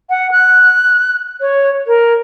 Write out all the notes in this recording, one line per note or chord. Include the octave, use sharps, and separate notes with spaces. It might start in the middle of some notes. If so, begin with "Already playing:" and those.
F#5
F#6
C#5
A#4